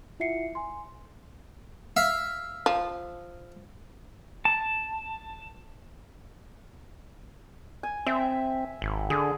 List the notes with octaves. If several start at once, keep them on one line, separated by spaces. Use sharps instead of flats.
E4 F4 E5 F#5 C7 C#7
G#5 C6
E5 F5
F3
A5
G#5
C4 E5
G#1
D3 G#4